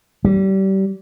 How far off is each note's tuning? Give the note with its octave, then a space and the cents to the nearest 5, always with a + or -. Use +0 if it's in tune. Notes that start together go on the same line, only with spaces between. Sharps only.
G3 -30